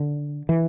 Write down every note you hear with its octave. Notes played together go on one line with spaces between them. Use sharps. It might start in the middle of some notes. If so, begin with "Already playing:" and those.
Already playing: D3
E3